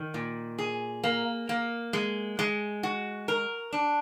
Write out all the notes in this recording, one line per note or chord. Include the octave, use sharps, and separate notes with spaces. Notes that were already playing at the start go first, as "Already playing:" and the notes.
Already playing: D#3
A#2
G#4
A#3
A#3
G#3
G#3
F#4
A#4
D4